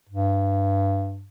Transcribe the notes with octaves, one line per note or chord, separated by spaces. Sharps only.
G2